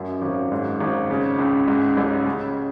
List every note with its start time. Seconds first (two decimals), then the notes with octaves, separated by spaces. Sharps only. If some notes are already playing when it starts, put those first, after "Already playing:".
Already playing: A1 F#2
0.22 G#1
0.51 G#2
0.80 G#1
1.10 C#3
1.38 C#2
1.67 G#2
1.97 A1
2.25 C#3